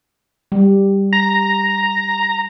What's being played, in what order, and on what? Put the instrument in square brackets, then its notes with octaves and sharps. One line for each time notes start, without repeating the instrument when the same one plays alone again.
[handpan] G3
[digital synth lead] A#5